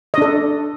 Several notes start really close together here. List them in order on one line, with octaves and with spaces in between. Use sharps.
D#5 D4 A4